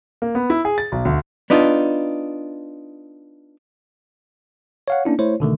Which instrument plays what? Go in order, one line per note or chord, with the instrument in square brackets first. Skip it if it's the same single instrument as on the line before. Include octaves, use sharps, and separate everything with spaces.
[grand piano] A#3
B3
E4
G#4
A6
B1
D2
[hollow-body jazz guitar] B3 D4 D#4 F4
[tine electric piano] C#5 F5 F#5
A#3 C#4 D4 E4
A3 E4 C5 C#5
B2 D3 D#3 A3